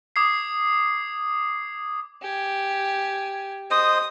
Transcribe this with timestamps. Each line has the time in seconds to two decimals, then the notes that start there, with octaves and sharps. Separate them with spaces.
0.16 D6 D#6 G#6 C7
2.22 G4 G#5
3.71 C5 D#5 D#6